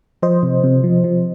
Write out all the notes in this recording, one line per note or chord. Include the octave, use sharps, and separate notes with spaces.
F3 C5 D#5
C3
C3
F3
F3